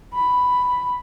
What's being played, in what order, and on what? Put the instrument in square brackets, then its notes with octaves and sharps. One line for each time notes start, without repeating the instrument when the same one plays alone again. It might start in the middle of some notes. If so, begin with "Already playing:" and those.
[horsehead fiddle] B5